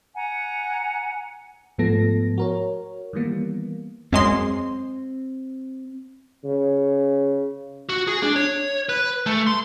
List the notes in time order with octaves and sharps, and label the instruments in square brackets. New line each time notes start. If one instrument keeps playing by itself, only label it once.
[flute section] F#5 G#5 A#5
[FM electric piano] G#2 F3 A3 B3 A4 A#6
F#4 A#4 C#5
D#3 E3 G3 A#3 B3
[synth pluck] F#2 G#3 C6 [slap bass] C4
[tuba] C#3
[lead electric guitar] F#4
G#4
D4
C#5
B4
A3
C6